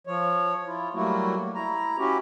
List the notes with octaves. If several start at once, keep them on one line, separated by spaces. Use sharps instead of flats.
F3 C#5
E4 F4
F#3 G3 A3 A#3 E4 F#4
E4 A#5
C#4 E4 F#4 G4